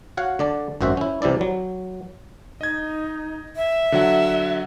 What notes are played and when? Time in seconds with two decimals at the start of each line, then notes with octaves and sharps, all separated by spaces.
0.17 F#4 C#5 F5 F#5
0.39 D3 D5 A5
0.81 G#1 F#2 F#4 C5 E5
0.97 C#4 E4
1.22 C2 C3 E3 E4 D5
1.41 F#3
2.61 D#4 D#5 G#6
3.56 E5
3.92 D3 F#3 F#5